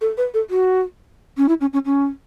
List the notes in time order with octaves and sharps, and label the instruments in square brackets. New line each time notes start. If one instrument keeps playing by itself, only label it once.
[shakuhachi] A4
B4
A4
F#4
C#4
E4
C#4
C#4
C#4